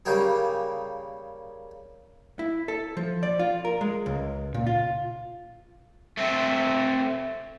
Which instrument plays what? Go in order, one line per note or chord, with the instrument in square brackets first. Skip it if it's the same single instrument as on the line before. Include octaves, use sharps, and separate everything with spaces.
[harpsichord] C#3 G3 A#3 G4 G#4
[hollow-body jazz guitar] E4
A4
F3
D5
F4
A#4
G#3
C#2
A#2
F4
[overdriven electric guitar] A3 C4